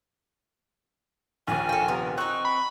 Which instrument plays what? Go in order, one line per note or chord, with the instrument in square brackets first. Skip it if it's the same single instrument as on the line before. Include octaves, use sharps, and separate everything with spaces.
[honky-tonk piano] A#1 D#2 [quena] G#5
[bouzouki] A4 G5
C3 B3 A#4
[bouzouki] C4 D#4 [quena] C#6 [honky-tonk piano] F#6
[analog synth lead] B5